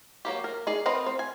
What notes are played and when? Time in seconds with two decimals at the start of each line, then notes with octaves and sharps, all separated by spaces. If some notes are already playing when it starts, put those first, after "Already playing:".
0.25 F#3 A#3 G4
0.44 A#4
0.67 D#4 G#4 D5
0.86 C4 A#4 B4 D#5
1.06 C4
1.19 G#5